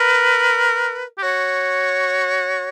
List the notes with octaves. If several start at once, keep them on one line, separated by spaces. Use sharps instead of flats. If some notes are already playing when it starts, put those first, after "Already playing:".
Already playing: A#4 B4
G4
F#4 C#5